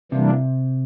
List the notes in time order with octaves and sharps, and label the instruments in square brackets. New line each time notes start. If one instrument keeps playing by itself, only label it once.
[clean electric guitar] C3 [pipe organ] E3 G3 A#3 D4